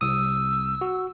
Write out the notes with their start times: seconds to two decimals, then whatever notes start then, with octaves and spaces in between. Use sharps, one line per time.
0.01 C2 D#6 E6
0.81 F#4